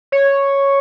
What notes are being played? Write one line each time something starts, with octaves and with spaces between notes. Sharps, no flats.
C#5